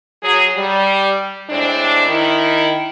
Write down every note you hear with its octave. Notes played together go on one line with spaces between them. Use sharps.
F#3 G#4
G3
A2 G#3 C4 D4
D#3 E4